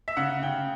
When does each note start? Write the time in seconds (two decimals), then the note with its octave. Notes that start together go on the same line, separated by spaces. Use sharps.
0.08 E5
0.17 C#3 F#5
0.43 C#3 G5